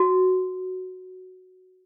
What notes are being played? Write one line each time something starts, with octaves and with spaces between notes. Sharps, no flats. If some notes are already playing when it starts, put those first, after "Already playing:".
Already playing: F#4